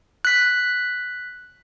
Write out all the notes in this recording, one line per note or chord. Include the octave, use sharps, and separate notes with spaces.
F#6 B6